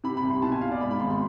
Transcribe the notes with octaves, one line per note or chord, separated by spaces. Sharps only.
C3 B5
B5
C2
C6
B2 A5
G#5
B2 F5
D5
G#2 B5
B5
G#1 C6
C6